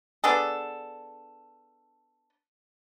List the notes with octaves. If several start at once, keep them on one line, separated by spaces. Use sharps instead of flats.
B3 D4 G#4 A4